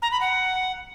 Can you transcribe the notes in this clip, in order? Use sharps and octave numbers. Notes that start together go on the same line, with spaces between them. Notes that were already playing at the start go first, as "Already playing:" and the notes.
A#5
B5
F#5